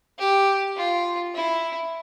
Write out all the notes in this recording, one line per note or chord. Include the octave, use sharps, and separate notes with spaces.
G4
F4
E4